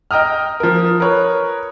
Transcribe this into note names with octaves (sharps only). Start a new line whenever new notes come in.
D#5 G5 A#5 D#6 F6
F3 A#4
A#4 B4 C#5